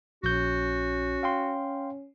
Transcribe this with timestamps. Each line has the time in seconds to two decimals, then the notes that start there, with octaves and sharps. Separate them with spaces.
0.24 A#1 C#4 F#4 G6
1.23 F5 G5 C6